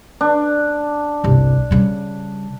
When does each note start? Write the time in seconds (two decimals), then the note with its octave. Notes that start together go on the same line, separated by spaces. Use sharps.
0.21 D4
1.24 G1 C2
1.71 C#3 G3